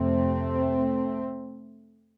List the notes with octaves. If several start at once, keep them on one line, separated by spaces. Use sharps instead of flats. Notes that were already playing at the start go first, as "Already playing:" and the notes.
Already playing: F2 C3 A3 C4